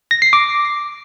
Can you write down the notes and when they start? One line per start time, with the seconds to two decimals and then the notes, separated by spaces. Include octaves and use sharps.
0.11 A#6
0.22 C7
0.33 D6